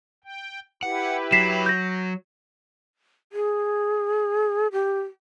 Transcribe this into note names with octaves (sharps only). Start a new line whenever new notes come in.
G5
E4 G4 B4 F#5
F#3 B6 C7 E7
G6 A#6
G#4
G4